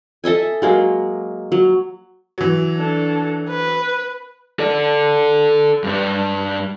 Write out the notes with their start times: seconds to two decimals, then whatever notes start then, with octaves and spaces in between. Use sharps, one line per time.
0.24 A4 D#5 E5 G#5
0.62 F#3 G#3 A#3
1.52 F#3
2.38 E3 F#3
2.76 D4 A4
3.49 B4
4.59 A4 D5
5.84 G2 D4